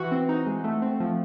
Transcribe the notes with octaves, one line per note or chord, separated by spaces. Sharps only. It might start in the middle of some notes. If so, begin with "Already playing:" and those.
Already playing: E3 F#4
C4
D#4
G#3
A3
C4
F3